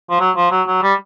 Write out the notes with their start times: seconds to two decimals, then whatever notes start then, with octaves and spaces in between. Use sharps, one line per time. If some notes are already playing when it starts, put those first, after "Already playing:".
0.10 F3
0.20 F#3
0.36 F3
0.51 F#3
0.67 F#3
0.82 G3